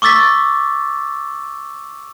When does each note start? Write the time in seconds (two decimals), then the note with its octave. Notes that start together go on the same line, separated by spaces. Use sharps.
0.02 C#6 D6 E6 A6 B6